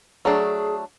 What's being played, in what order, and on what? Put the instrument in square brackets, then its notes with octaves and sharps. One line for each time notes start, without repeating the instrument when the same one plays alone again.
[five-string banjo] F#3 A3 D4 [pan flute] G#4